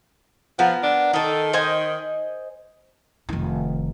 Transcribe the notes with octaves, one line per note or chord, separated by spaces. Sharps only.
F3 B3 A#4
D4
D#3 D#4 A4
C5 D#5 G#5
F1 D#3